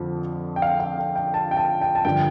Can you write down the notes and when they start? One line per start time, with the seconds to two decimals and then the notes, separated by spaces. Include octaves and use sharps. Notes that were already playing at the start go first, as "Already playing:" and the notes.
Already playing: F2 D3 F3
0.56 G5
0.62 F5
0.80 F5
0.98 G5
1.16 G5
1.34 A5
1.51 G5
1.57 A5
1.82 G5
1.95 A5
2.05 G2 D3 F3 G5